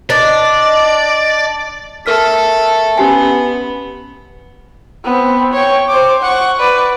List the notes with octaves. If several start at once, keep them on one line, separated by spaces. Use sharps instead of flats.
D4 D5 D#5
A3 A4 A#4 F6 B6
B3 C#4 G4 G#5
B3 C4
C#5 G5
C5 D6
F#5 C#6
B4 D5